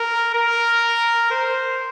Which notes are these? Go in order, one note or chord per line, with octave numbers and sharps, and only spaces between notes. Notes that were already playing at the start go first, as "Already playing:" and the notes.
Already playing: A#4
A#4
C5